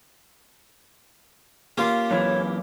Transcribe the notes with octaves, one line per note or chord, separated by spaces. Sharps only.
A#3 C#4 F4 G4 A#4
F#2 E3 C#5